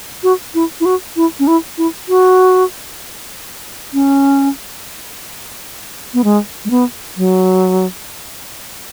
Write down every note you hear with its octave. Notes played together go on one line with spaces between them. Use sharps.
F#4
E4
E4
F#4
E4
C#4
E4
E4
F#4
C#4
B3
G#3
G#3
B3
F#3